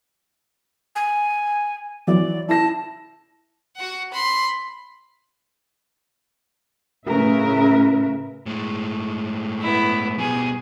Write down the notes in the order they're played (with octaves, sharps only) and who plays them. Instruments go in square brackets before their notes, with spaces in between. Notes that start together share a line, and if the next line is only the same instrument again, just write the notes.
[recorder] G#5
[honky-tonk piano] E3 F#3 [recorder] D5
[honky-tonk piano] E4 A#6 [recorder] A5
[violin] F#4 F#5
B5 C6
[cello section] A2 C#3 A#4 B4 E5
[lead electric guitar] A2 G#3
[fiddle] B3 E4
[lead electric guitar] B2 G3 [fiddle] G#4